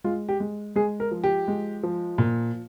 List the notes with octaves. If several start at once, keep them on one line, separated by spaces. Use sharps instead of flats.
G#3 F4
G4
G#3
G#3 G#4
A#4
F3
G4
G#3
F3
A#2